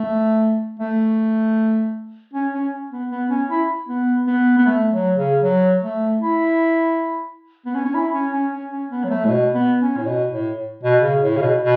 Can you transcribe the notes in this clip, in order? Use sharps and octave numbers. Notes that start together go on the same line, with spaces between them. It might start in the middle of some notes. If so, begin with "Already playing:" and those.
Already playing: A3
A3
C#4
C#4
B3
B3
C#4
E4
B3
B3
B3
A3
F#3
C#3
F#3
A3
E4
B3
C#4
C#4
E4
C#4
C#4
C#4
C#4
B3
F#3
A3
A2
B2
B3
C#4
A2
B2
A2
B2
C#3
A2
C#3
B2
B2